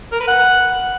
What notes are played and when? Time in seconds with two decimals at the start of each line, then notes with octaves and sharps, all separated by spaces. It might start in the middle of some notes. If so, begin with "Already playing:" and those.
0.12 A#4
0.20 B4
0.28 F#5